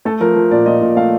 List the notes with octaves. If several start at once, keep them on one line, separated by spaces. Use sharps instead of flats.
A3 A4
F3 A#4
F3
A#2 D5
A#2 D#5
A#2
A3 F5